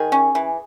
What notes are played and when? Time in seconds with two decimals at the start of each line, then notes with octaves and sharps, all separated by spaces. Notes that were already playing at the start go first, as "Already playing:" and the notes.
Already playing: D#3 G#4
0.12 C#4
0.35 E3